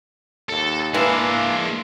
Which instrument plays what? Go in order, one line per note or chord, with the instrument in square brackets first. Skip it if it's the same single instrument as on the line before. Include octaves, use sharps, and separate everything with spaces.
[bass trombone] D#2 [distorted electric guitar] A4
[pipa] E3 [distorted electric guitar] G#3 E5 [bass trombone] A#3 [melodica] D4 F5